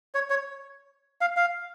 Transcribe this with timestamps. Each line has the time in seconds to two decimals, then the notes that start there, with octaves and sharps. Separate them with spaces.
0.15 C#5
0.30 C#5
1.21 F5
1.37 F5